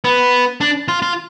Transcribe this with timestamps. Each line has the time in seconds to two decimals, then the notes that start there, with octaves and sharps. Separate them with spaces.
0.04 B3
0.61 D4
0.88 F4
1.02 F4